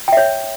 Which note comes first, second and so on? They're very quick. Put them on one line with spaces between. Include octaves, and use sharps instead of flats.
G5 E5 C#5